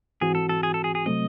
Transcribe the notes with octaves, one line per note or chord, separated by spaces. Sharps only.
G#2 E3 C4 F#4 G#4
A4
A4
G#4
A4
G#4
G#4
C3 F#3 A3 C4 D#5